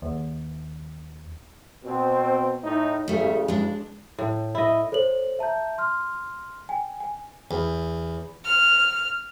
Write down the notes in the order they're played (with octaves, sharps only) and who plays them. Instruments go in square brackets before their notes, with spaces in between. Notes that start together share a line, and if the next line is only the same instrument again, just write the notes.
[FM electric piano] D#2
[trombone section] B2 C4
A2 D#4
[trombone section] A1 C#3 [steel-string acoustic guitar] G3 A3
[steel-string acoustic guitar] G#3 D4
[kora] A2
E4 D#5
[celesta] A4 C5 C#5 F#7
E5 A5 A#5 G6
C6 F6
G5 G#5
G#5
[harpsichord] E2
[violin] F6